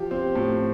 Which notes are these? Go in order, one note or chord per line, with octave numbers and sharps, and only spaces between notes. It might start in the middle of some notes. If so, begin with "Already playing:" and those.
Already playing: F3 G4
C4
A2